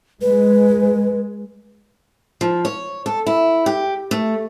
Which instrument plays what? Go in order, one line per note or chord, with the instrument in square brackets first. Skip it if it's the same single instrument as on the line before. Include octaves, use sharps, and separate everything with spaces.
[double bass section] G#3 [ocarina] B4
[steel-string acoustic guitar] F3
C#5
A4
E4
G4
A3